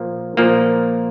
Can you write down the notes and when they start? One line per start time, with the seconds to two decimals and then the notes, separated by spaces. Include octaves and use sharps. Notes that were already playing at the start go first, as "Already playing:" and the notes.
Already playing: A#2 F3 A#3
0.37 A#2 F3 A#3